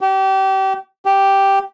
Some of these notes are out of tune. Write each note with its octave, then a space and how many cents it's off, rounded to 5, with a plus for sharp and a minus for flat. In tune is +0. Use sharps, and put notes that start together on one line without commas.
G4 -30
G4 +0